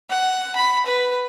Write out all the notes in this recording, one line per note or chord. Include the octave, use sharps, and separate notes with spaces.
F#5
B5
B4